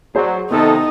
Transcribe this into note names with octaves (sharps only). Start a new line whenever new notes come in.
F#3 G#4 C5 D5
C3 D#3 B3 D#4 A4 D#5